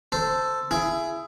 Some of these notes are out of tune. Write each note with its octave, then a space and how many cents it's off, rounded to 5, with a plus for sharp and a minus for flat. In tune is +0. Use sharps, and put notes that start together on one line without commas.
A4 +5 C5 -15
E4 +25 G#4 +10